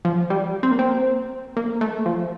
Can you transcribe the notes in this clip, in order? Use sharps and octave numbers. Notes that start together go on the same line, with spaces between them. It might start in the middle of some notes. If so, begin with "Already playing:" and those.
F3
G3
C4
A#3
C4
A#3
A3
F3